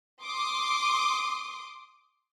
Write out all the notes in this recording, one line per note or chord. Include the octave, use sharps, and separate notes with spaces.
C6 D6 D#6